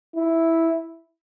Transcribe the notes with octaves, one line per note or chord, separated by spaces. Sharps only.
E4